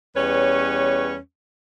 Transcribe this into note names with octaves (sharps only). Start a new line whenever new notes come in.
E2 G3 C#4 B4 C#5